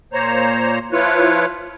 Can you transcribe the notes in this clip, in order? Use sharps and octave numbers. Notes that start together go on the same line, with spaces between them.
A#2 A#3 C5 C#5 A#5
F3 E4 F4 B4 C#5